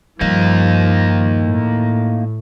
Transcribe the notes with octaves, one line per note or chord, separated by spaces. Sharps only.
G2 F3 A#3 D#4
A2